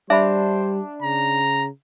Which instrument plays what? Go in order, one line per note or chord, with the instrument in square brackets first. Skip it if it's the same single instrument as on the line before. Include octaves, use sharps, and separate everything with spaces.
[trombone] G3 [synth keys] D4 [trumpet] C5 [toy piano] E5 B5
[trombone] C#3 [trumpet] A#5